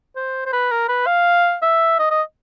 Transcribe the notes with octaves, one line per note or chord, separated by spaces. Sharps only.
C5
C5
B4
A#4
B4
F5
E5
D#5
D#5